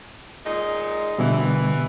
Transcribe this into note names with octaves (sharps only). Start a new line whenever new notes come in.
A#2 G#3 D#4
B2 D3 E3 G3